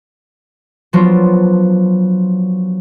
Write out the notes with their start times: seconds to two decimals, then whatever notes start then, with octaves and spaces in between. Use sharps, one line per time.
0.93 F3 F#3 B3 D4 F4